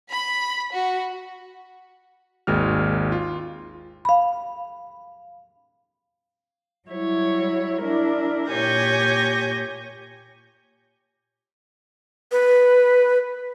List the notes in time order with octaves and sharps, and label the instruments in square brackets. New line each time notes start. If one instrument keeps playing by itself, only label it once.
[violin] B5 B6
F#4
[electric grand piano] G#1 D#2 G#3 F#4 F6
F4
[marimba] F5 B5
[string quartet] F#3 G3 E4 C#5
D4 E4 A#4
A#2 G4 C#5 G#5 G6 A#6
[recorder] B4